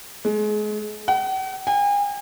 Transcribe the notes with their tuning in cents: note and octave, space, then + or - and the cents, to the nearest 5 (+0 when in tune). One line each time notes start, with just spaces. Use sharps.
G#3 +30
F#5 +45
G#5 -40